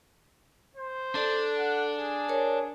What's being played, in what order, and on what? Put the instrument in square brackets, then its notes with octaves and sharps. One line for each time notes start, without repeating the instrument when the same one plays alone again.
[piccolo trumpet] C5
[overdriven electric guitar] D4 [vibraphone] A4
[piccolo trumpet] F#5
G#4
[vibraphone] A#4 C#5